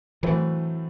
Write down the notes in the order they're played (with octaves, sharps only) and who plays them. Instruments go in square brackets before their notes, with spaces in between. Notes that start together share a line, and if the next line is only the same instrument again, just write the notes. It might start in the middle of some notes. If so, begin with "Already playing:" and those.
[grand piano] A2 F#3 A3 C4 [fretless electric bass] E3